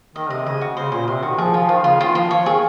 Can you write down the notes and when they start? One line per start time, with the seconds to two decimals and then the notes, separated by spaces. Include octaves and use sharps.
0.15 D#3 D#5
0.30 C3 D#5
0.46 C#3 D#5
0.61 F#4
0.77 C#3 C5
0.92 A#2 C5
1.08 C3 C5
1.22 D#3 F#4
1.38 F3 G#4
1.54 F3 F4
1.69 D#3 F4
1.84 C#3 F4
2.00 D#3 F4
2.15 F3 F4
2.31 F3 C#5
2.46 D#3 G#4